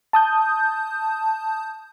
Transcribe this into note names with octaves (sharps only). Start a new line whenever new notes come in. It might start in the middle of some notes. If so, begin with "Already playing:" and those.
A5 D#6 G6